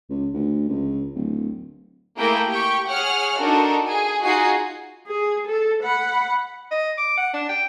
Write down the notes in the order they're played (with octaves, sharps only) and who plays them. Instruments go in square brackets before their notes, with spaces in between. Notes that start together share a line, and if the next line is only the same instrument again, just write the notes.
[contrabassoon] C#2
D2
C#2
D1
[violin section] A3 A#3 E4 G#4 A#4 G5
G4 G5 C#6
G#4 C#5 F#5 F6
D4 D#4 F#4 A4 A#4
G#4 G#5
D#4 F4 F#4 G#4 G#5 C7
[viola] G#4
A4
F#5 B5
[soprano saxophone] D#5
D6
F#5
D4
G5